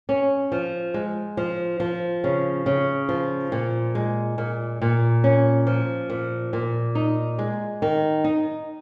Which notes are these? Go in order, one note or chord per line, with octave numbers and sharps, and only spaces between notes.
C#4
F3
G#3
F3
F3
C#3
C#3
F3
A#2
G#3
A#2
A#2
C#4
F3
A#2
A#2
D#4
G#3
D#3
D#4